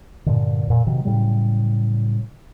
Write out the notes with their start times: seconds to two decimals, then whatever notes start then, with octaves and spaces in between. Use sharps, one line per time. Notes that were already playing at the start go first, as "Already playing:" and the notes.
0.26 G2 A#2 D3
0.67 F2 A#2
0.87 C3 D#3 F#3
1.05 A2 C#3 F#3 G3